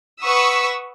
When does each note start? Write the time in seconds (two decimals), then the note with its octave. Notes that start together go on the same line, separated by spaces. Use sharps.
0.22 B4 F#5 C#6 D#6 E6 B6